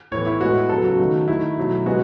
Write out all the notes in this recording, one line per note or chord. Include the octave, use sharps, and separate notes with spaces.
A2 E3 B3 C#5
E4
A2 G#3 B3 F#4
C#3 F#3 B3 A4
F#4
D#3 F#3 A3
D#3 A3 E4
B2 F#3 A3
C#3 G#3 B3 F#4